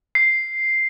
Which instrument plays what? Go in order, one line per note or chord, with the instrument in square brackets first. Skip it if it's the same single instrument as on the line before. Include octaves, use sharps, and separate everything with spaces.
[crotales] C7